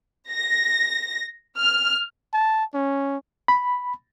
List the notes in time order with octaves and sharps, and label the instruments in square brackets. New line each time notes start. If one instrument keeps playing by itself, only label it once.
[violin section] A#6
F6
[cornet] A5
C#4
[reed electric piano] B5